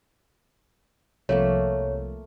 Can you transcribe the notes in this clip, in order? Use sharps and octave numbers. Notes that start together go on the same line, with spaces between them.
C2 C3 F3 A3 A#3 A4 C#5